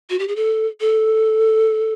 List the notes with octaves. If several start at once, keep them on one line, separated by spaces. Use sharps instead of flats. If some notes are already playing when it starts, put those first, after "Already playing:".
F#4
G4
G#4
A4
A4